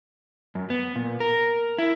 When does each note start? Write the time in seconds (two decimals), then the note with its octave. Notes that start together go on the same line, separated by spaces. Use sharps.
0.55 F#2
0.70 B3
0.96 A#2
1.20 A#4
1.78 E4